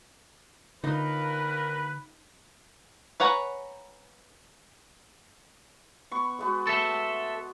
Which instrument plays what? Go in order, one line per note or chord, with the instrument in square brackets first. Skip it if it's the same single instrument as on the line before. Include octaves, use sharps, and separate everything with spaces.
[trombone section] D#2 A#4 [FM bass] D3 [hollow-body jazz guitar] D#4 F4 D#5 [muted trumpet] B4
[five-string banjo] B4 C#5 F#5 G#5 A#5
[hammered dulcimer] B3 C#6
G#3 B3 F#4
[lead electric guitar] A4 E5